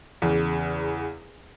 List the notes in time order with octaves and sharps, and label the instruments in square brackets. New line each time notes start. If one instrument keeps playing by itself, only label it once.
[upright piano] E2 C#3